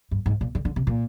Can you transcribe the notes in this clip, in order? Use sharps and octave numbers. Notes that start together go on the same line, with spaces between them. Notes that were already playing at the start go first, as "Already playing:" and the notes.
G2
G#2
A#2
D3
D3
C3
A#2